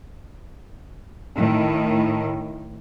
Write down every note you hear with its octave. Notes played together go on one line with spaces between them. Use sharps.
A2 D#3